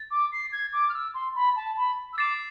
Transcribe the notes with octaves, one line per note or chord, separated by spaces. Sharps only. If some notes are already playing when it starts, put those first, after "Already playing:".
Already playing: A6
D6
C7
G#6
D6
F6
E6
C6
B5
A5
B5
E6
D6 A6 C7 E7